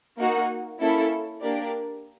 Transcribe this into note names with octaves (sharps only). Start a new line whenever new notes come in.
A#3 D#4 F#4
A#3 C#4 E4 A4
A#3 D4 G4 A#4 D5